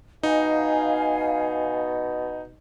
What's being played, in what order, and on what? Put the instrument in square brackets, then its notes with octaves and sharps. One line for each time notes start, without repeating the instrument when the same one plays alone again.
[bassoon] B2 [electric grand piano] D#4 [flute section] F5 G#5